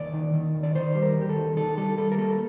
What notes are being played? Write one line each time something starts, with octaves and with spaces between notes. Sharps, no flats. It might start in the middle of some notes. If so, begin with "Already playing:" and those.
Already playing: D#2 D5
D#3
D#3
D#2
D5
D#3 C5
G3
A#4
D#2
G4
A4
D#3
D#3 A4
G3 A4
G3 A4
A#4
A#3 A4